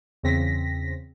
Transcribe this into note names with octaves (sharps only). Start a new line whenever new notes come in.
E2 C#3 C4 A#6 B6